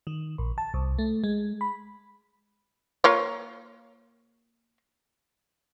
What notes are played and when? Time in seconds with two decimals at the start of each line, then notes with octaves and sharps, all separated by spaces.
0.07 D#3
0.38 A#1
0.58 A5
0.74 C2
0.99 A3
1.24 G#3
1.61 B5
3.04 A#3 F4 C#5